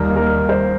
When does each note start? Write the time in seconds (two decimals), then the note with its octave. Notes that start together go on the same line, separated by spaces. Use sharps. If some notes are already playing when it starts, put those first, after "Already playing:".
Already playing: D#2 D#3 G3 A#3 A#4
0.16 A#4
0.49 C5